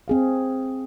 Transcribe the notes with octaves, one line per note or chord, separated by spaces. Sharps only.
C4 G#4 F5